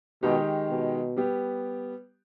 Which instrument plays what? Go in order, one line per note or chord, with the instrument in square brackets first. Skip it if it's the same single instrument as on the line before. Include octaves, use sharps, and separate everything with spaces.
[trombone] B2 [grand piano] D#3 G#3 D#4 G4
[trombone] B2
[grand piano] G3 B3 G4